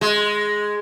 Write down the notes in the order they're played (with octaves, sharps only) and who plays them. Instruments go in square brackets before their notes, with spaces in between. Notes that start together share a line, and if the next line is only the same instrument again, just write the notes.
[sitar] G#3